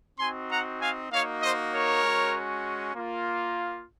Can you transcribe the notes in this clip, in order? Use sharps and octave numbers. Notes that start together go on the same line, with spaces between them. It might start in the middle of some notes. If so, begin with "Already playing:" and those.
C4 D#4 F#4 G#5 C6
F#5 A#5
F5 G#5
A#3 D#4 F#4 C#5 F5
C5 D#5
A#4 C#5
G#3 C#4 F#4
A#3 F4